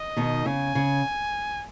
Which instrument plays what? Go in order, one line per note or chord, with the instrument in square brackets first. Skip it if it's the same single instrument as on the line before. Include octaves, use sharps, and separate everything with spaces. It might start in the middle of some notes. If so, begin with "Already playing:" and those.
Already playing: [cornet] D#5
[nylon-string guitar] B2 D#3
[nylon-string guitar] C#3 [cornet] G#5
[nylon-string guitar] C#3